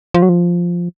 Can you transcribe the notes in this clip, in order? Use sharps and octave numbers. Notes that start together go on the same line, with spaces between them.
F3
F#3
F3